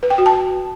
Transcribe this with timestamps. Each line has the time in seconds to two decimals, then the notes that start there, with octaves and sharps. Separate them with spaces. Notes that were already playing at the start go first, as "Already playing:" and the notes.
0.03 B4
0.10 G5
0.18 F#4
0.26 A5